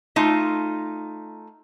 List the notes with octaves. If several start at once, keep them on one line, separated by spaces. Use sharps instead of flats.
A3 D#4 F4